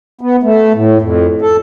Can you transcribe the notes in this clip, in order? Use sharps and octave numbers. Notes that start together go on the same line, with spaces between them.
B3
A3
A2
F2
A4